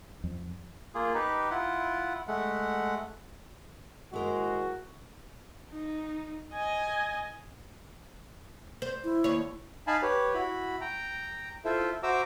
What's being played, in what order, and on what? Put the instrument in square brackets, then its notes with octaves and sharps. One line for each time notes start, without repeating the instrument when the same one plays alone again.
[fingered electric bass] F2
[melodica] A#3 F4 G#4
D#4 G4 B4
E4 F4 F#5
G#3 A3 F#5
[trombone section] D#2 G#3 [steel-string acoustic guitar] E4 A#4 C5 [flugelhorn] F#4
[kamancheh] D#4
D#5 G#5
[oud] C5
[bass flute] E4
[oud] D#2 C#5
[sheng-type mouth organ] D#4 F5 G#5 A5 B5
G4 B4 C#5
E4 F#4 B5
G5 A#5
E4 F4 A4 C5 E5
F#4 C5 E5 A#5 D6 E6